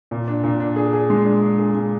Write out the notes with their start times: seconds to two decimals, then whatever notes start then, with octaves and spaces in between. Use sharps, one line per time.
0.11 A#2
0.28 D4
0.44 A#2
0.60 D4
0.76 G#4
0.93 G#4
1.10 G#3
1.26 D4
1.42 D4
1.59 G#4
1.75 G#3